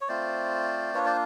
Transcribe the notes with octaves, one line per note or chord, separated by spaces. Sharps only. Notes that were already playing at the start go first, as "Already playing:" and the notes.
C#5
A3 C4 F4 C5 D5
A#3 D4 F4 B4 C#5
C5 D5